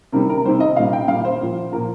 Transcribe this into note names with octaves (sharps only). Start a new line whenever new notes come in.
C3 D#3 G3 A#4
A#4
C3 D#3 G3 C5
D#5
A#2 G3 F5
G5
A#2 G3 F5
C5
A#2 F3
A#2 F3 A#4